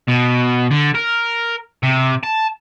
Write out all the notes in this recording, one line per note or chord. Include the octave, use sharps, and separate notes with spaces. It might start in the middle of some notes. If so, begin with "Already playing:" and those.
B2
D3
A#4
C3
A5